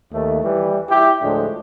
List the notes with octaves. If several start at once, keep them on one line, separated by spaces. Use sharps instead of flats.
D#2 A3
E3 G3
E4 G4
D2 A2 F3 G#3 D4